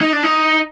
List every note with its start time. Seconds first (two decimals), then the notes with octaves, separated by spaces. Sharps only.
0.01 D#4
0.13 D4
0.23 D#4